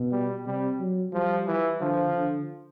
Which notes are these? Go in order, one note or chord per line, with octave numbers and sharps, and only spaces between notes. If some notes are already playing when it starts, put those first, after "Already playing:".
Already playing: B2
G3
C3 G3
F#3
F3 G3
E3
D3 F3
D3